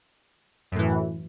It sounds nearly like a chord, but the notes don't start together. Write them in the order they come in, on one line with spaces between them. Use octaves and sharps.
F#2 A2 E3